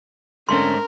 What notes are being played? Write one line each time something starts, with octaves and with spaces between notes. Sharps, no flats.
G#2 D3 A3 C4 C#4 A#4 C6